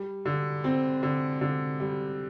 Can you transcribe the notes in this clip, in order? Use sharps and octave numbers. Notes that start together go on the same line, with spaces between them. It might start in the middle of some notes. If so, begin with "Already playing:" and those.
Already playing: G3
D3
C4
D3
D3
G3